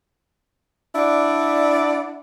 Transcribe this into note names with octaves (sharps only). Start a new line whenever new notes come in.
D4 E4 D5 F#5